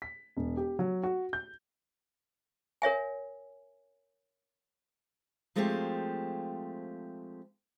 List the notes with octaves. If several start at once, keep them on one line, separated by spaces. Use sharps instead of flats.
B6
E1
G4
F#3
F#4
G6
A#4 C#5 E5 G#5
F3 G#3 A3 C4 F4 G4